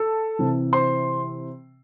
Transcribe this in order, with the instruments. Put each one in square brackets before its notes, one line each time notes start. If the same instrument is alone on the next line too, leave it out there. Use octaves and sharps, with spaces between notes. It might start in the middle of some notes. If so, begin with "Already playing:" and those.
Already playing: [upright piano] A4 A5
C3 E3
C5 C6